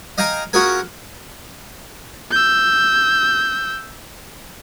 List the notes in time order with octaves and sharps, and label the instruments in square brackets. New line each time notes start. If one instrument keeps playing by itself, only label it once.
[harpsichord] D#5 F5 G5 G#5 A#5
C#4 F4 F#4 G#4 A#4 G#5
[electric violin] E6 G6